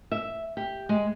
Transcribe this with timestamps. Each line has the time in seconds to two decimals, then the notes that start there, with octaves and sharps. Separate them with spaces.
0.12 E5
0.57 G4
0.89 G#3